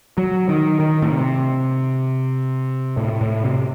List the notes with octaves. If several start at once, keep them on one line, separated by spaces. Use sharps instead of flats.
F#3
D#3
D#3
A2
C3
A2
A2
C3